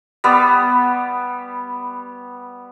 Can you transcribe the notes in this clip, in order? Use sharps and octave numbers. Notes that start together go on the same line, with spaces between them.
G3 B3